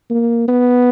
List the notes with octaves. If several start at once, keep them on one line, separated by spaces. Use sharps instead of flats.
A#3
B3